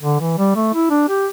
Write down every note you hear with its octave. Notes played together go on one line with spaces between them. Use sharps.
D3
E3
G3
A3
E4
D4
G4